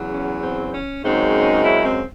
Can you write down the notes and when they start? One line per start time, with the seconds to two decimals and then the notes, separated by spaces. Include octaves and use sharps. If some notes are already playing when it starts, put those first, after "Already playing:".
Already playing: E2 C#3 F#3
0.13 C#4
0.42 C4
0.74 C#4
1.04 F#2 C#3 G#3 C4 D#4
1.65 E4
1.85 C4